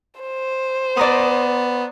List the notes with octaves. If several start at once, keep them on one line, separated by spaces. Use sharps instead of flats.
C5
B3 D5 A#5 D#6